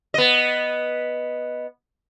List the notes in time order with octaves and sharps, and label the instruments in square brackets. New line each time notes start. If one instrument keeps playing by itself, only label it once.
[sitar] B3 D#5